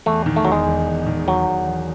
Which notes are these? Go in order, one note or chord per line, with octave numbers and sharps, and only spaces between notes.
E2 A3
D#3
A3
E1 F#3
G#3
E1
E2
D#3
E1 F#3
E1
E2